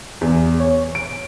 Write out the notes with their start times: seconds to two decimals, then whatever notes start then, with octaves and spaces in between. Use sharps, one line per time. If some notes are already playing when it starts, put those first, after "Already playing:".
0.21 E2
0.60 C#5
0.95 D7